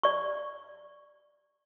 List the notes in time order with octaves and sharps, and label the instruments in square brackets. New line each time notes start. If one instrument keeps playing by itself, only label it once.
[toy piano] D5 C#6